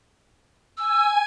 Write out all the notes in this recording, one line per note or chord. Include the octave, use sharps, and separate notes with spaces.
G#5 E6